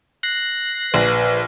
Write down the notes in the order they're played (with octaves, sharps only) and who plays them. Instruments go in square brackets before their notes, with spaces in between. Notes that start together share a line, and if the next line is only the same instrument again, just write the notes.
[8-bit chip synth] F#6 A#6 C7
[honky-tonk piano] A#1 [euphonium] B4